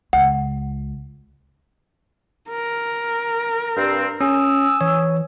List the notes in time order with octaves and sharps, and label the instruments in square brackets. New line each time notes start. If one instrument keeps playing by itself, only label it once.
[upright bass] C#2 [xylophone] F#5
[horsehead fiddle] A#4
[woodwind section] G2 C4
[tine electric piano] C#4 [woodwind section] G#5 D#6 E6
[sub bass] E3 [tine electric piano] C#5